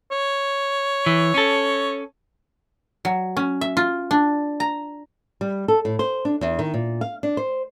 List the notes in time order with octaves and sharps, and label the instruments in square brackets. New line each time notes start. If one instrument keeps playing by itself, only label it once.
[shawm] C#5
[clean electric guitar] E3
C#4 A4
[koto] F#3
C#4
E5
F4
D4
A#5
[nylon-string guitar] G3
A4
A2
C5
D4
E2
D#3
A#2
F5
D4
C5